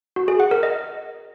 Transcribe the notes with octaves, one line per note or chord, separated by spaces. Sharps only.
F#4
G#4
F#5
A#4
D#5